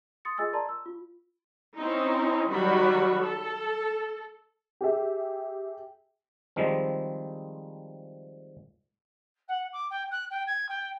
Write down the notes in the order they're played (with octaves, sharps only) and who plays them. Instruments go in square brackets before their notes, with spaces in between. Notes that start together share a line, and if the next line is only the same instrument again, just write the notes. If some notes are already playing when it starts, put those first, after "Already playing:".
[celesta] C6 D#6 A6 C#7
F4 G#4 D#5 G#5 E6 A6
A#4 D5 A5 A#5 C6
E6
F4
[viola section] C4 C#4 D#4 E4
D#3 F#3 G3 F#4 B5
A4
[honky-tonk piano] G4 G#4 E5
[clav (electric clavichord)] D#3 F3 G3 G#3 C4
[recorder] F#5
D6
G5
F#6
G5
G#6
G5